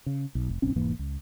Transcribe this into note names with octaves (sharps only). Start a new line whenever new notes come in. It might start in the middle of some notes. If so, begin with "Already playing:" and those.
C#3
B1
F1
F#1 B1 C4 C#4
E1 G#2 E3 A#3
C#2